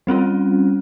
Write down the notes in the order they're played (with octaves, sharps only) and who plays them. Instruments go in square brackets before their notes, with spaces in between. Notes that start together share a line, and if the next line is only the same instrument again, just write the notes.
[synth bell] G3 C4 C#4 F4